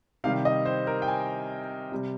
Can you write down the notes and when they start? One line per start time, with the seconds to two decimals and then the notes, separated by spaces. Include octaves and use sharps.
0.24 C3 D#3 G3 F5
0.45 D#5
0.66 C5
0.87 A#4
1.02 G5
1.08 G#5
1.92 C3 G3